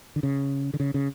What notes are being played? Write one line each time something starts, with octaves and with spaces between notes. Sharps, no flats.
D3
C#3
D3
C#3
C#3